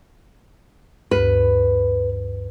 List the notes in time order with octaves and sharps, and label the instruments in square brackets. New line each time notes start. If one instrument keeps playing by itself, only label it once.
[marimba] D2 G2 [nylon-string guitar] B4